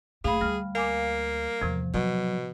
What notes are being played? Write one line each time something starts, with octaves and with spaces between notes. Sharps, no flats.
F#1 A3 G#4 F5 B5
D2 G3 F6
A#3 F5 G#5 D6
E2 A2 C3 F3
B2 F#3